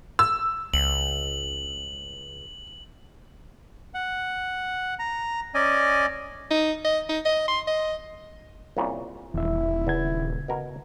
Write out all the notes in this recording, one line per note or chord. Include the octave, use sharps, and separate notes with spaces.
E6
C#2 F#7
F#5
A#5
C#4 D5 D#5 G#5
D#4
D#5
D#4
D#5
C6
D#5
C2 A#2 C#3
D#1 E2 E4 E5
E2 C#3 G#6
B2 A#4